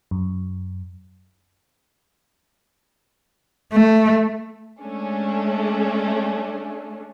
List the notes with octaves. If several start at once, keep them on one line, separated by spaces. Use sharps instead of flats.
F#2
A3
G#3 A3 C#4 D4